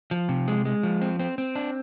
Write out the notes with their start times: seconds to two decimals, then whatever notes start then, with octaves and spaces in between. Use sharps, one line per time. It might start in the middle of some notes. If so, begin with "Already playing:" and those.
0.11 F3
0.29 C3
0.48 G#3
0.65 G#3
0.83 F3
1.01 C4
1.20 C4
1.38 C4
1.56 D4